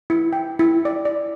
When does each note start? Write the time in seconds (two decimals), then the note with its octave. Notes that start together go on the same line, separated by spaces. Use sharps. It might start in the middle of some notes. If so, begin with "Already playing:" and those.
0.10 E4
0.33 G5
0.59 E4
0.85 D5
1.05 D5